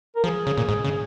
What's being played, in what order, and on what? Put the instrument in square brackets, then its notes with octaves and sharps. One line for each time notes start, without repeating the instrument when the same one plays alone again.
[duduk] A#4
[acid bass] F3 [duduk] G#4
[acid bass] C#3
A#2
G#2
C#3